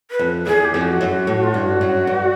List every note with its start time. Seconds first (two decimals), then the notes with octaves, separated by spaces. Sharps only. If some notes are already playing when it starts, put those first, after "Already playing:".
0.11 B4
0.19 F2
0.46 E2 G#4
0.64 G4
0.74 F2
0.82 F#4
1.01 F#2
1.27 A2
1.43 F4
1.53 G2 F#4
1.81 F#2
2.07 G2